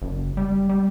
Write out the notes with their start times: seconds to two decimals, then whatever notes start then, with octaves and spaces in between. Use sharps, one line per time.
0.02 F#1
0.37 G3
0.69 G3